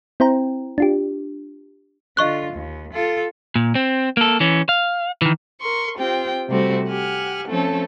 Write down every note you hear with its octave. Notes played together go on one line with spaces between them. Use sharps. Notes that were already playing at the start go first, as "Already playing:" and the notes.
C4 E4 C5 G5 A#5
D4 F4 G4
D3 F4 D#5 C#6 F#6
D#2
F4 A4
A#2
C4
A#3 A4
E3 C#4
F5
D#3 E3
A#4 C6 C#6
C4 F4 G4 G5
C3 G3 A3 C4 F#4
G4 F#5 G#5 F6
F3 A3 C4 C#4 A4